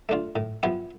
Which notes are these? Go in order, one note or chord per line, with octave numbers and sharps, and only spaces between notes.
A3 D4 F4
A2
F3 B3 E4 G4